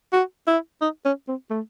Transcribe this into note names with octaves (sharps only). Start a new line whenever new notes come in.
F#4
E4
D#4
C#4
C4
A3